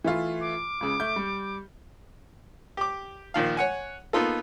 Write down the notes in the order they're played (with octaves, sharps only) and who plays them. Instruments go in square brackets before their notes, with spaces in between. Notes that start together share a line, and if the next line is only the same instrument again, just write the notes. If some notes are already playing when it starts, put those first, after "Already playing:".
[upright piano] E3 A3 F4
[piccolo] D6
[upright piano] C#2 C#3
A3 G6
G3
[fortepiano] G4 D6
A#2 D#3 F3 F5
C#5 F#5 G#5
A#3 B3 D#4 F4 A4